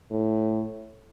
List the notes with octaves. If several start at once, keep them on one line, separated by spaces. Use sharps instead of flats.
A2